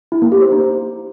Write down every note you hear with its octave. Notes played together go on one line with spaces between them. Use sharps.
E4
A#3
G4
C5
D#4